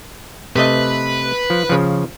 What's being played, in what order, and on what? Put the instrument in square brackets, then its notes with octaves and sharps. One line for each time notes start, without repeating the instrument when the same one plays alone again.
[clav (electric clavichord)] C3 A3 D#5 [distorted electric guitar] B4
[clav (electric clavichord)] F3
C#3 F3